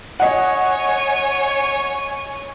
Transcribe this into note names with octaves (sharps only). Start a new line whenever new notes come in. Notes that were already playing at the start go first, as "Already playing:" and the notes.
C#5 D#5 F#5 G#5